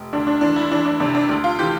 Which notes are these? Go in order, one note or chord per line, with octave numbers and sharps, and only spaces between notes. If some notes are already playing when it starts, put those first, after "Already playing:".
Already playing: F1
D2 D4
D4
E3 D4
E4
E3 D4
D4
C3 D4
D4
D2
F4
E3 G4